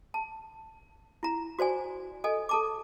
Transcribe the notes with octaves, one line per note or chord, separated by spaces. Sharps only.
A5
E4 A#5
F#4 C5 D5 G#5
A4 D#5 G#5
A4 A5 D6